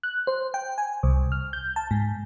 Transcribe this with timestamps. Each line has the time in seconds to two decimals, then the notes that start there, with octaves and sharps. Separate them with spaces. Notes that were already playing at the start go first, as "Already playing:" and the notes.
0.03 F#6
0.27 C5
0.54 G5
0.78 G#5
1.03 C2
1.32 F6
1.53 G6
1.76 A5
1.91 G#2